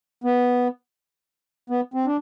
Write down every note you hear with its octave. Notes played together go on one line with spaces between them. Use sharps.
B3
B3
C4
D4